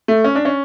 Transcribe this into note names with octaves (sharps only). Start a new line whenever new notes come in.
A3
C#4
D4
C#4